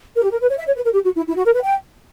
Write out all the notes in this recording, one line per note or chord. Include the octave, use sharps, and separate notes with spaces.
A#4
G4
A#4
B4
C#5
E5
C#5
B4
A#4
G4
F#4
E4
E4
F#4
A#4
B4
G5